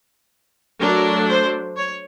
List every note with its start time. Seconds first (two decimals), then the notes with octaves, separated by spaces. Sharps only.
0.82 F#3 A3 D4 A#4
1.29 C5
1.77 C#5